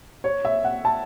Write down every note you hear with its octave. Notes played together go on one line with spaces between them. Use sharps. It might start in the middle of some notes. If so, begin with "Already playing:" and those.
C#5
E5
F#5
A5